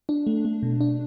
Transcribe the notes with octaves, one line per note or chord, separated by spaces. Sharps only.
D4
A3
A3
B2
D4